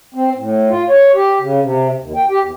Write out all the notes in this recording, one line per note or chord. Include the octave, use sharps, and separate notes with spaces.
C4
A2
F4
C#5
G4
C#3
C3
D#2
G5
G4
E2